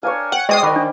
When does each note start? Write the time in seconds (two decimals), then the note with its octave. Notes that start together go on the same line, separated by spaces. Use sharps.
0.03 D4 A#4 C#5 F5 G#5
0.32 F#5 G5
0.49 G#3 F#4 C5 D5 D#5 D#6 C7
0.63 D#3 F#4 B4 D#5 B5 D6
0.76 D4